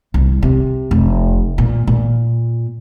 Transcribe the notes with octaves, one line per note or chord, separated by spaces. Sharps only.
C2
C3
F1
A#2
A#2